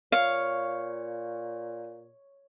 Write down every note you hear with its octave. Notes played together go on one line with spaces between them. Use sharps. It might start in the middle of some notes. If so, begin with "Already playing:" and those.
A#2 C#5 F5